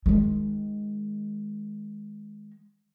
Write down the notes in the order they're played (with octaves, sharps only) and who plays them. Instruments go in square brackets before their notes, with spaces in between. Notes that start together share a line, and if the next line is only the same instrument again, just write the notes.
[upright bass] D#3 G#3